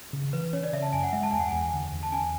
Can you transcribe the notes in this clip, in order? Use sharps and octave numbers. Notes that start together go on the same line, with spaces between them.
C#3
E3 B4
C#4 C#5
D5
C#3 E5
A5
F#2 G#5
F#5
G#3 E5
A5
E2 G#5
F#5
E2 G#5
D3
E2
A5
C#4 G#5